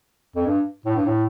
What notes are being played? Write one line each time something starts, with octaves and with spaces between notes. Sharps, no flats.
F2
G2
A2
G2
A2